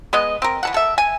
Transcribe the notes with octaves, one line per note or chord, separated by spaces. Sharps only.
G#3 B3 D#5
C4 A#4
E3 A4 F#5
A4 E5
G#5